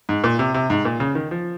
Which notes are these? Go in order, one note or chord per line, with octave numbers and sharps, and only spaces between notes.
G#2
A#2
C3
C3
G#2
A#2
C#3
D#3
F3